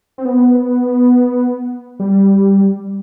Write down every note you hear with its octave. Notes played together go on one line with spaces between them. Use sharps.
C4
B3
G3